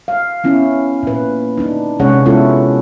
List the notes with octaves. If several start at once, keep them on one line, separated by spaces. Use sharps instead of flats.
F5
B3 C#4 E4
A#2 B4
D4 D#4
C3 G#3 C#4 G#4 C#5 F#5
G#3 B3 C#4 E4 F4 A4